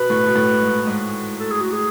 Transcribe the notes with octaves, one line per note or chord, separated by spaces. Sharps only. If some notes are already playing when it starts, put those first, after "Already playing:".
Already playing: B2 B4
A2
B2
A2
G#2
G#2
A4
G#4
F#4
G#4